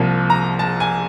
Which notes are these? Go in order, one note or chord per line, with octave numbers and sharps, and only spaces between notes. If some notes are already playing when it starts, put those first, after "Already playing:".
Already playing: C2 C3 F3 A#3
A#5
A5
G#5